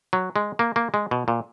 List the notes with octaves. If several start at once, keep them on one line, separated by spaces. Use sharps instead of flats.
F#3
G#3
A#3
A#3
G#3
B2
A#2